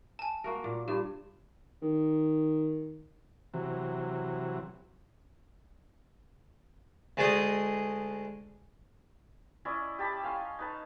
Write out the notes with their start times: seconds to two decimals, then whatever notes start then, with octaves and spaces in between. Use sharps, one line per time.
0.19 G#5 A5
0.44 A#3 F#4 A#4
0.64 A#2
0.88 G2 A#2 G4
1.82 D#3
3.54 C3 E3 F#3
7.17 D2 G#3 A3 D4 G#4 D#5
9.65 C#4 E4 D5 D#5
9.99 G4 A5 B5
10.23 C#4 F5 G#5 C6
10.59 D#4 B4 A5